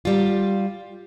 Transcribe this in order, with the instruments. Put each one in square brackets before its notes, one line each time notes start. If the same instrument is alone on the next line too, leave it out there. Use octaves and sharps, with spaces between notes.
[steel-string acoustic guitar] G3 F4